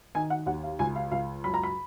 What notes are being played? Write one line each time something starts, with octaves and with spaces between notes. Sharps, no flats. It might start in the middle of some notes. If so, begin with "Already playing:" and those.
D#3 G#5
F#5
D#2 F#5
F5
C#2 G#5
F5
C#2 F5
F#2 B5
A#5
B5